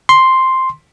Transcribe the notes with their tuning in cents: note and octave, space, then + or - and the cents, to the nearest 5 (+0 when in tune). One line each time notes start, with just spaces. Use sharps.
C6 +0